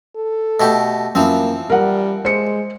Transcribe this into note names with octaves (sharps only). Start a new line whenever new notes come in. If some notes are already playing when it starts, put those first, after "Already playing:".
A4
B2 A3 G4
F#2 E3 F3 A#3 C4
G3 A#4 F#5
G#3 C5 C#7